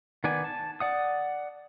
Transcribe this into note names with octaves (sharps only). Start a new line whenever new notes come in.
D#3 B3 D5 G#5
A5
D5 F#5 D#6